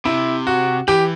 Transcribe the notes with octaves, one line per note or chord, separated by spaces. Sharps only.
C3 E4
F#4
E3 G4